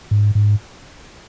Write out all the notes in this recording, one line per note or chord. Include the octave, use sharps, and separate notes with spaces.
G#2
G#2